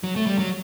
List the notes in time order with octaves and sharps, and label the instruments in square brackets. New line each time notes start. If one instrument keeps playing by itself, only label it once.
[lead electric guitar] F#3
A3
G3
F#3